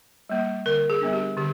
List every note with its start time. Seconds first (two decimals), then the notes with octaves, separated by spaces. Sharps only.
0.29 G3 A#3
0.66 D3 A#4
0.90 G#4
1.01 G3 B3 D4
1.13 G4
1.37 D3 G4